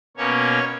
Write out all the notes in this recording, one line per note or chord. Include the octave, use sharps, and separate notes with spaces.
B2 A#3 C#4 C#5